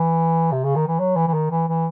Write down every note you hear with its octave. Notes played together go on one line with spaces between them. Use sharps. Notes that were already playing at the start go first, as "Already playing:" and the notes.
Already playing: E3
C3
C#3
D#3
E3
F#3
E3
E3
D#3
E3
E3